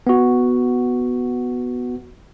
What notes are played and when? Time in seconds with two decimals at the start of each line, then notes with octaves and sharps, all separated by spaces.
0.07 B3 F#4